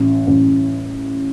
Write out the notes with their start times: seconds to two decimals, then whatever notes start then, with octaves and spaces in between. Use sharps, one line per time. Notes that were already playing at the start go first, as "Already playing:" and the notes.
Already playing: A1
0.27 A1